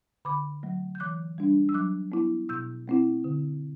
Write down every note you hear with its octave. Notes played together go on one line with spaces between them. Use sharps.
D3 B5 D6
F#3 A3
G6
E3 D6 F#6
G3 D4
E6
F#3 D6 F#6
B3 E4
B2 E6 G6
A3 C4 E4
D3